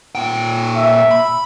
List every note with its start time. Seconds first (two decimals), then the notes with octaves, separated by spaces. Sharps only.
0.15 A#2 G5
0.77 E5
1.11 B5